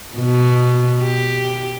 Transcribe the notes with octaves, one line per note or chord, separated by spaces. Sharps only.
B2
G4